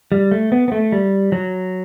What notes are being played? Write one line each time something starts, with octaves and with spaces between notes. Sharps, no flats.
G3
A3
B3
B3
A3
G3
F#3